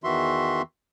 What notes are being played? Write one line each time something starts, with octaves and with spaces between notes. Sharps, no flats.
E2 D#3 E3 F#4 E5 C6